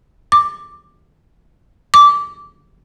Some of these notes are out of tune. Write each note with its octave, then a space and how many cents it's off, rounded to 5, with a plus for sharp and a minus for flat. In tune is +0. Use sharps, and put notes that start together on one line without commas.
D6 +5
D6 -15